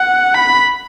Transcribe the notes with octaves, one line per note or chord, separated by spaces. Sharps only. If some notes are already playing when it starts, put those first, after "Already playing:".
Already playing: F#5
B5